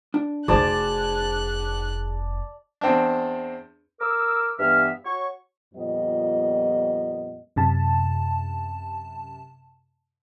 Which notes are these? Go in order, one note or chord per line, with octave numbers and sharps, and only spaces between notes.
D4
F1 D#4 F#4 G#4 C5 D5 A5 F#6
E2 C4 D4
A#4 D6 E6
G2 E3 B3 E5 F5 F6
F#4 C#5 C#6
F2 A#2 G3 B3 D#5
F#2 C3 A5